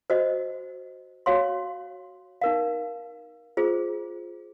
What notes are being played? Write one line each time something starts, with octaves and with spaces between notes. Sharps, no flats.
F#4 C5 D#5
F#4 C#5 F5 C6
D#4 A#4 F5
F4 G#4 C5